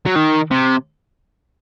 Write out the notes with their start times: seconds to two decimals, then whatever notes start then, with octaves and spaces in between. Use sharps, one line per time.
0.06 F#3
0.16 D#3
0.51 C3